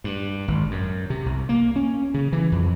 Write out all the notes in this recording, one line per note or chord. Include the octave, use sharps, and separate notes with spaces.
G2
G#1
F#2
C3
C2
A#3
C#4
C#3
E3
F2